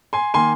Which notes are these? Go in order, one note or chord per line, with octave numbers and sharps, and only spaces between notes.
G#5 C6
D#3 A#3 G#5 C6